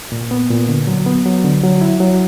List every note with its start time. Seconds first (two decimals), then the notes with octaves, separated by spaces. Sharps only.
0.12 A#2
0.31 B3
0.51 A#2
0.68 D3
0.87 F#3
1.06 B3
1.26 F#3
1.44 D3
1.63 F#3
1.81 E4
2.00 F#3